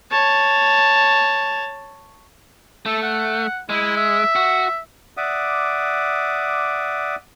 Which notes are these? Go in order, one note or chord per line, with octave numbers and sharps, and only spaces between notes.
C#5 A5
A3 A4
F#5
G#3 E4
E5
F#4
D5 E5 F#5 D6 D#6